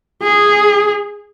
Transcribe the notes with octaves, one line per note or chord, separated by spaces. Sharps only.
G#4